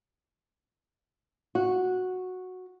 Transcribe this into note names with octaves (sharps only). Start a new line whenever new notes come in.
F#4